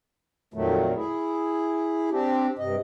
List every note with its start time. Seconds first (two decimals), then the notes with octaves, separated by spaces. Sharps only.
0.54 F2 A#2 D#3 F#3 A3
0.95 E4 G#4
2.11 C4 D4 G4
2.59 G2 C3 D#5